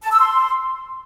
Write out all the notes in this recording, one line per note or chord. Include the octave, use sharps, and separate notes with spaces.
A5
E6
C6